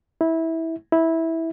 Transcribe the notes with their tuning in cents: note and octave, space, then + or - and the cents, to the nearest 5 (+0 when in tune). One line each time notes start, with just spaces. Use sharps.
E4 -20
E4 -15